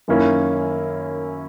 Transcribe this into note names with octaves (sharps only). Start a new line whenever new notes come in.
F#2 D#3 A#3 C#4 E4